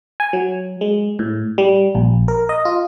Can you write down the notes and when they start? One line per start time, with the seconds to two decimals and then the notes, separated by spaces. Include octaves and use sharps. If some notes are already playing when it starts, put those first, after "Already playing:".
0.20 G#5
0.33 F#3
0.81 G#3
1.19 A2
1.58 G3
1.95 A#1
2.28 A#4
2.49 D#5
2.65 F4